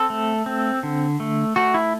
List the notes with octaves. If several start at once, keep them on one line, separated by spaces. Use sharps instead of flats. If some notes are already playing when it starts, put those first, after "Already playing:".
Already playing: C4 A4
A3
C4
D3
A3
A3 F#4
E4